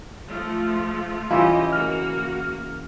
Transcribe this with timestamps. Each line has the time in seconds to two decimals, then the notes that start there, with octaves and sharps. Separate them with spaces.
0.26 F3 A3 F4
1.31 C#3 E3 E4 F4 G4 D#5
1.73 A#3 F#4 F6